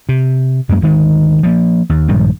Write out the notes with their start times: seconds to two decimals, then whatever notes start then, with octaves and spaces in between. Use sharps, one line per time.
0.09 C3
0.69 F#2 G#3 A#3
0.81 D2 D#3 G#3
1.43 F3 G3 A#3
1.89 D#2
2.08 A#1 G2 D#3 G#3